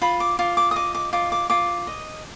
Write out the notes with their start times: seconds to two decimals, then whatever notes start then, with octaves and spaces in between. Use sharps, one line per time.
0.02 F4 B5
0.20 D6
0.39 F4 D6
0.57 D6
0.71 D#6
0.76 D#5 D6
0.95 D6
1.13 F4 D6
1.32 D6
1.50 F4 D6
1.87 D#5